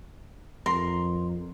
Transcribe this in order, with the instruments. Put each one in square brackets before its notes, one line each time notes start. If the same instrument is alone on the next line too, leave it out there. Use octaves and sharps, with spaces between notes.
[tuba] F2 [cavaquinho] A#4 C6